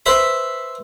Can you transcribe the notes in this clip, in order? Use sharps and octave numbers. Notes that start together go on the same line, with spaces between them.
B4 C5 E5 B5